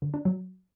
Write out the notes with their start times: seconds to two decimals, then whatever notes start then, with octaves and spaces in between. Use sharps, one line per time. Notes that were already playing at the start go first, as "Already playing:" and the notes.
0.02 D3
0.14 D4
0.25 F#3